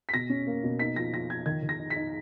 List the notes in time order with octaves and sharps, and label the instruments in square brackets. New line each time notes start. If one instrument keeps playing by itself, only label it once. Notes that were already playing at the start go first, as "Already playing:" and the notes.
[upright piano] B6
B2 A#6
C#4
A#3
B2
D#4 B6
F3 A#6
F3 A#6
F3 G#6
D#3 G#6
D#3
A#6
D#4
B6
D#4